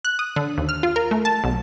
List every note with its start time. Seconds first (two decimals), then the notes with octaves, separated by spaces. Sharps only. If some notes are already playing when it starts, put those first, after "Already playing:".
0.05 F#6
0.19 D#6
0.36 D3
0.58 D#2
0.69 F6
0.83 F4
0.96 A#4
1.11 A3
1.25 A5
1.44 B1